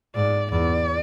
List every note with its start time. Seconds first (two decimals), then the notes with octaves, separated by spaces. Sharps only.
0.15 G#2 D5
0.52 E2 D5